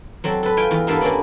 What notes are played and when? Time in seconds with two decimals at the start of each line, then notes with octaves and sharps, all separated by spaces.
0.24 F#3 C4 A4
0.43 A4 B4
0.57 F4 G5 G#5
0.71 E2 F4
0.87 G2 A#3 B3 A4 E5 F5
1.01 A#3 B3 C#4 A4 D5